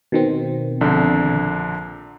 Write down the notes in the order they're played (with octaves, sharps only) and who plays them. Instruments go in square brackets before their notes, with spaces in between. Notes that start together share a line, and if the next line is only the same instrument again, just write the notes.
[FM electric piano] B2 D#3 C4
[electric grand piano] A#1 D3